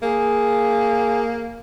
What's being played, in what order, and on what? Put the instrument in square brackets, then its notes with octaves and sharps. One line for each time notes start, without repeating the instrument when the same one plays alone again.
[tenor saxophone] A#3 [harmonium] G#4